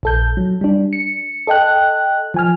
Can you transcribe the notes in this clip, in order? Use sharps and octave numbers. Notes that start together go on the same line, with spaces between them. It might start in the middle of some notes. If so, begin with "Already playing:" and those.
A#1 A4 G6
F#3
G3 D4
C#7
A4 D#5 G5 F#6
F3 G#5 F6